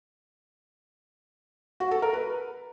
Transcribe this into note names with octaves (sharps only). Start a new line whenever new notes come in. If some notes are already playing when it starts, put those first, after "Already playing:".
F#4
A4
A#4
B4